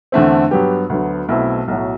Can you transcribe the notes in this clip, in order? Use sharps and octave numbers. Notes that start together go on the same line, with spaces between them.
E2 D3 A3 C4
G2 F#3 B3 G4
D2 D3 F#3 B3
B1 B2 A3 C4 E4
B1 A2 F#3